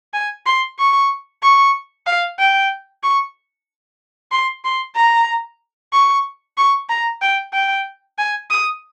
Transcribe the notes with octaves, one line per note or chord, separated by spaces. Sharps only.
G#5
C6
C#6
C#6
F5
G5
C#6
C6
C6
A#5
C#6
C#6
A#5
G5
G5
G#5
D#6